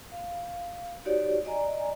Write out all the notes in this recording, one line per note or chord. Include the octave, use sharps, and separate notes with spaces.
F5
D#4 F#4 G4 C#5 D5
D5 D#5 G#5 A#5